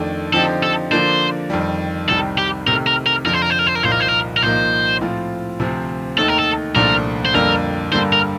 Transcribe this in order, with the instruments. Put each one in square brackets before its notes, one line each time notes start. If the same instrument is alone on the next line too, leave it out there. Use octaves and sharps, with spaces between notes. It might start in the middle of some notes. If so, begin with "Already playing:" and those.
Already playing: [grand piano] F2 D#3 A3 D4
[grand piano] D3 F3 C4 D#4 G4 [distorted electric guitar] A4
[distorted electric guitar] A4
[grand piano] D3 F3 A#3 D4 [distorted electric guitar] C5
[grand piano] F2 D#3 G3
[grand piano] C2 C3 D#3 G3 [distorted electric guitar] A4
[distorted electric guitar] G4
[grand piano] C3 D#3 A3 [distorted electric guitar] A#4
[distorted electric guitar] A#4
A#4
[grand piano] F2 D3 F3 [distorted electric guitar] A#4
[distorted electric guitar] C5
A#4
C5
A#4
C5
A#4
[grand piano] C2 A#2 F3 A#3 D#4 [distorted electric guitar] C5
[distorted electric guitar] A#4
C5
A#4
A#4
[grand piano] C2 A#2 F3 A#3 D#4 [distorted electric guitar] C5
[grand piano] A2 F3 C4 F4
D2 C3 F3 C4
[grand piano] D#2 D#3 A3 D#4 [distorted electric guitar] A4
[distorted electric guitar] A#4
A4
[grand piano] C2 A#2 F3 A3 D4 [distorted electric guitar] A#4
[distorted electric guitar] C5
[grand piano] F2 D3 G3 A#3 [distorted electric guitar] A#4
[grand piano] G2 D3 G3 A#3 [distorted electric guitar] C5
[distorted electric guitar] A#4